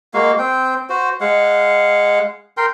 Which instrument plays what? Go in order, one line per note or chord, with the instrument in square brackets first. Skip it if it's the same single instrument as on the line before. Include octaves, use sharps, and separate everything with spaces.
[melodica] G#3 A#3 F#4 F5
C4 G5
F#4 C5
G#3 F5 F#5
A#4 G5 C6